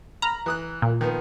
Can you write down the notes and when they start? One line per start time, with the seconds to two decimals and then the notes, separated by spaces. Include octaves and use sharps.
0.22 A#5 B5 F6
0.46 E3 D#6 F#6
0.82 A#2
1.01 D#3 F3 B3